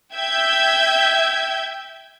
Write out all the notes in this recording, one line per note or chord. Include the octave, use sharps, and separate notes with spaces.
E5 G5 E6 G6 G#6